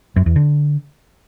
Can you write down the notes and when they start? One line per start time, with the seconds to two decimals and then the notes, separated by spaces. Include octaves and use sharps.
0.16 F#2
0.26 E2
0.36 D3